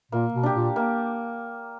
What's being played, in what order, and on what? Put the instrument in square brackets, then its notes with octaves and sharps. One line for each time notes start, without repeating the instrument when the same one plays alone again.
[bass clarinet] A#2 [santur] A#3
[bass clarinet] B2
[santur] D4 G4
[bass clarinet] A#2
[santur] A#3